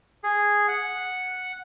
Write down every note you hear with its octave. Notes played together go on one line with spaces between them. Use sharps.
G#4
F#5